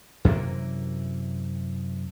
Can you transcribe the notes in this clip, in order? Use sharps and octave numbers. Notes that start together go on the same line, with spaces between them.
F#2 C3 E3 A#3